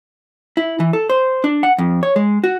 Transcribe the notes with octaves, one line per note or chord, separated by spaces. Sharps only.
E4
E3
A4
C5
D4
F#5
F2
C#5
G#3
F#4